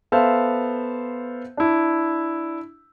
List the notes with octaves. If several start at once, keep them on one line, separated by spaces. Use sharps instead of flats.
B3 A4 C5 E5 F5
D4 E4